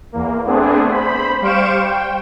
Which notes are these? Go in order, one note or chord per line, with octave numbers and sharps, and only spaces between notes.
E2 A#3
A3 B3 C4 D4 G#4
C5 B5
G3 C5 F5 C#6 D7 E7
G5